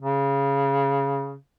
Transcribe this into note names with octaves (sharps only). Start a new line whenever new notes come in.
C#3